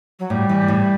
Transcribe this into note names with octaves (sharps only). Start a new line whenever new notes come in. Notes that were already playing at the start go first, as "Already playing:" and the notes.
F#3
A2 G3
E3
A2